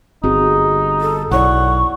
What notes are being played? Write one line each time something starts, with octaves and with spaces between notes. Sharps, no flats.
G1 C4 D#4 F#4 G#4
A4
B1 E4 C#5 D5 F#5 C#6